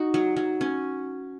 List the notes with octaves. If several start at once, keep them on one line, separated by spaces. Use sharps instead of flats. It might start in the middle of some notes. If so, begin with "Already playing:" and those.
Already playing: D#4 F#4
F#3
F#3
C#4